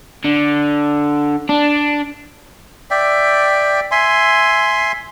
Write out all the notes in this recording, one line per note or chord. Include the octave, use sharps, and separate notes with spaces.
D3
D4
D5 E5 G5
E5 G#5 C6